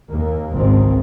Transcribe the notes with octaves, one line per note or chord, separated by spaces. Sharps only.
D#2 A#3
G#1 C#2 G#2 D#3 C4